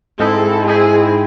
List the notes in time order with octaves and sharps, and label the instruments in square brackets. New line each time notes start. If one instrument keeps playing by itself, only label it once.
[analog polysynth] G#2 G#3 C4 E4 [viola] A4
[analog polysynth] G#2 G#3 C4 E4 [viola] G#4